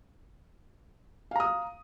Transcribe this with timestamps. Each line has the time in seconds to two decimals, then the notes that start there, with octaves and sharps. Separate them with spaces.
1.31 F5
1.36 A#5
1.40 D#6